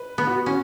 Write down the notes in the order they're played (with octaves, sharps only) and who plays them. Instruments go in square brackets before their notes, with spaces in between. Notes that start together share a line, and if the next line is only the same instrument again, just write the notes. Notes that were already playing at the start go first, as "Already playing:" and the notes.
Already playing: [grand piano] B4
[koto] B3
[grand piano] F#4
[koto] C#4 [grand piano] F#4